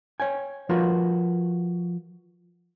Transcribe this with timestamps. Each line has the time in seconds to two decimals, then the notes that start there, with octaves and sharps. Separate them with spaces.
0.20 C#5 G5 G#5
0.69 F3 F4 F#4 A#4 B4